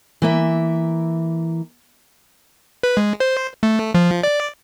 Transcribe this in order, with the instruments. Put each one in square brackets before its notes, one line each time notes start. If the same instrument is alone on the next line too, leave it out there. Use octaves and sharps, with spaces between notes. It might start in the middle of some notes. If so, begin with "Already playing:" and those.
[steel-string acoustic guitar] E3 A#3 E5
[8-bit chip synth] B4
G#3
C5
A3
F3
D5